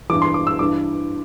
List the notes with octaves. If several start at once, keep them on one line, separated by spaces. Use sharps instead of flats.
G2 E3 D6
C6
D6
E6
G2 E3 D6